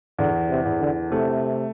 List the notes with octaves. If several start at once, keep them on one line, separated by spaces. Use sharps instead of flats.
E2 D3
C3
E2
D3
C3 A3